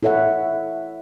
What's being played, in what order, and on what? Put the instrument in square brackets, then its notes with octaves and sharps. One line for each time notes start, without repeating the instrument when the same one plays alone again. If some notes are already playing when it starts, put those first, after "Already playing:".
[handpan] E4 A4 C#5 E5 F#5